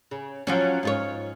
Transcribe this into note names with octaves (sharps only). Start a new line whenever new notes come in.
C#3
F3 F#3 C#4
G#2 F4 C#5